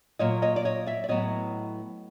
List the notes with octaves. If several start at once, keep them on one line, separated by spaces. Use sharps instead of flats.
A#2 F#3 A#3 C#5 D#5
C#5 D#5
D5
C#5 D#5
D5 E5
D5
A2 F#3 B3 C#5 D#5